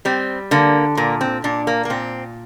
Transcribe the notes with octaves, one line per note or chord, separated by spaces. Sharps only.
G3 C4
D3 A#3
A#2 A#3
C4
A#2 D4
A#3
A#3
A#2 C4